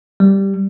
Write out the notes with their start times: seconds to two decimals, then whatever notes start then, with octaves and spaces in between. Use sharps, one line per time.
0.20 G3